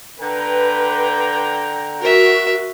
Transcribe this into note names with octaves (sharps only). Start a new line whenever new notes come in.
D3 B4 G5 A#5
F#4 A#4 E5